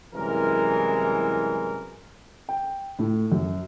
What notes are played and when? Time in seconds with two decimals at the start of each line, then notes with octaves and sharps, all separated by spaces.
0.14 C2 F#2 E3 G#3 A#4
2.49 G5
2.99 A2
3.32 F#2